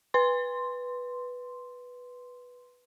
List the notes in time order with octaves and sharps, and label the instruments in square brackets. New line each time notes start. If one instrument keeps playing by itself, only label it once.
[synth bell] B4 C6